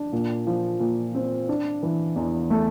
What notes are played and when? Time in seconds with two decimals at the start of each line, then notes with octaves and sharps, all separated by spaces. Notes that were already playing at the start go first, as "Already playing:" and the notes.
Already playing: D4
0.12 A#2
0.47 F3
0.80 A#2
1.15 C4
1.49 D4
1.83 E3
2.16 E2
2.50 A3